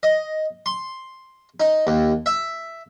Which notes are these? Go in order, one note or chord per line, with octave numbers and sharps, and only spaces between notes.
D#5
C6
D#4
D#2
E5